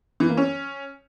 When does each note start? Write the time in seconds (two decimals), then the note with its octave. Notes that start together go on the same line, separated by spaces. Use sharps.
0.20 E3
0.29 A#3
0.37 C#4